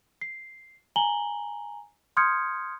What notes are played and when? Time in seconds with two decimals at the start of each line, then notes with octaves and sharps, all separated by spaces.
0.21 C7
0.96 G#5 A#5 F#7 G7
2.17 C6 D#6 F6 G6 G#6 C#7